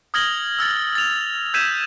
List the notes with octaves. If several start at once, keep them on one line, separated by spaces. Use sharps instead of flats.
D#6 F6 G#6 A#6 F#7 G7
E6 F6 A6
A6 F7
E6 G6 G#6 B6 D#7 E7